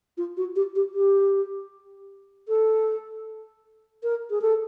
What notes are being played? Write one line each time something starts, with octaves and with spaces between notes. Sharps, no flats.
F4
F#4
G4
G4
G4
A4
A#4
G#4
A4